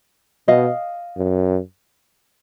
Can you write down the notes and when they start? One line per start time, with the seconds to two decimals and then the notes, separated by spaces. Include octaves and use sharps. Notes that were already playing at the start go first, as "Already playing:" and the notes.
0.48 B2 D#5 F5
1.17 F#2